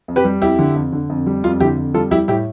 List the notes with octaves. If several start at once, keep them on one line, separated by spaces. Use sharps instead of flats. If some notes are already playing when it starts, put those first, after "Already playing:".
F2
G4 B4
G3
F2 E4 G4
D3
F2
D3
F2
G3
F2 F4
D3 E4 G4
F2
G3 F4 A4
G3 E4 G4
A2 E4 G4